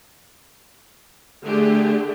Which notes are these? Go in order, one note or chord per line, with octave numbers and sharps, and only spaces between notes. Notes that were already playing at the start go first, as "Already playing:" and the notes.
D3 A3 G4 G#4